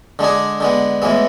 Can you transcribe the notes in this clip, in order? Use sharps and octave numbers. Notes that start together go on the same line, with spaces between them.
D3 G#3 D4 G#4
D3 G#3 B3
A2 E3 G#3 B3